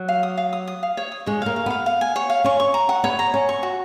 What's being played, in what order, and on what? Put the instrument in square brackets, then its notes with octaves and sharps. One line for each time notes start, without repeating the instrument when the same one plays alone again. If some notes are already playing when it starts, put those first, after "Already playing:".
Already playing: [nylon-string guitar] F#3
[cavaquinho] F5
D#6
F5
D#6
D#6
F5
C#5
D#6
[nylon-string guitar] G#3 [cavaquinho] C#5
[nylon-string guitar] A#3 [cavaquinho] F5
[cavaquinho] F5
[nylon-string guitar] B3 [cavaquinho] F5
[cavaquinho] F5
G#5
C#5
F5
[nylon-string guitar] C#4 [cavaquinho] C#6
[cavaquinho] C#6
A#5
F#5
[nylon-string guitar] B3 [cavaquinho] C#5
[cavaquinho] A#5
[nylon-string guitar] C#4 [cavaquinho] C#5
[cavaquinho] C#6
F#4